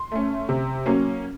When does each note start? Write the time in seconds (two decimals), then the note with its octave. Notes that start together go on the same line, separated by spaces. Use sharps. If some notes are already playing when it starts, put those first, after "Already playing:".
Already playing: C6
0.12 A3 C#4
0.49 C3
0.86 F#3 A#3 C#4